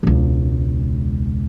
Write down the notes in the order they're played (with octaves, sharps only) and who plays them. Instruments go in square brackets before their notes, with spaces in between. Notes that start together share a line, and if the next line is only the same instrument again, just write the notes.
[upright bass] E1 C#2